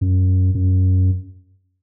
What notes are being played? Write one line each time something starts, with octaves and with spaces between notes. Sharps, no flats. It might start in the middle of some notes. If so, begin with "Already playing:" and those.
F#2
F#2